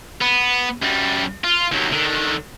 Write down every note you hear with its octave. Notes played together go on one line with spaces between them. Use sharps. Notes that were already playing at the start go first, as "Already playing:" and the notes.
B3
F#2 G3
F4
D#2 F#3
D3 D#3